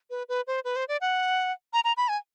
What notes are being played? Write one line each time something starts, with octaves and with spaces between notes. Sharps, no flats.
B4
B4
C5
B4
C5
D5
F#5
A#5
A#5
B5
G#5